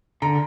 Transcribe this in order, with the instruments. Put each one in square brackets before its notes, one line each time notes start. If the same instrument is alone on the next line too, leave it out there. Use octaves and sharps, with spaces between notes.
[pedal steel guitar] D3 [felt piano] A#5